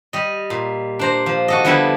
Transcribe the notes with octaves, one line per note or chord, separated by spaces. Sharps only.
G3 D#5
A#2
D4 C5 A#5
F3
F#4 A4 D#5
D3 F3 G3 B3 E4 B4